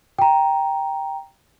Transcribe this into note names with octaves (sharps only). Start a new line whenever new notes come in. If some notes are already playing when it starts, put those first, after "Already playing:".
G5 A#5